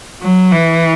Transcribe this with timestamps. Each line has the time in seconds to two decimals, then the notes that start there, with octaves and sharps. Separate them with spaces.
0.21 F#3
0.52 E3